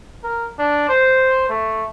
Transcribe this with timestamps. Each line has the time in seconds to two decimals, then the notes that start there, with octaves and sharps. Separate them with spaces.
0.24 A#4
0.59 D4
0.89 C5
1.49 A3